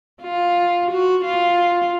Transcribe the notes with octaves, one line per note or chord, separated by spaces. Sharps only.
F4
F#4
F4